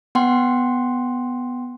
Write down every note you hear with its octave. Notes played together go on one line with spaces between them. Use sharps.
B3 F#5 G5 C6